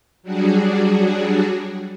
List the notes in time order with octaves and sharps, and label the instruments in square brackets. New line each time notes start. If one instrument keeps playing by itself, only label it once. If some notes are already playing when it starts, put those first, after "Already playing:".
[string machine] F#3 G3 D4 F#4 G#4